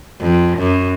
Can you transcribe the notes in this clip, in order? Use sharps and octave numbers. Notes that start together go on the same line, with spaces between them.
F2
F#2